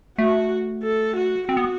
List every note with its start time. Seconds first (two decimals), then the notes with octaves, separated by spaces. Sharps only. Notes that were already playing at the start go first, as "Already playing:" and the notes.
0.18 A3 F#4
0.83 A4
1.16 F#4
1.48 C4 F#4
1.57 B3